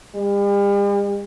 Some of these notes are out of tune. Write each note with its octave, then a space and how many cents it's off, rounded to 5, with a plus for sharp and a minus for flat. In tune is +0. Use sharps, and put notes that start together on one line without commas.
G3 +45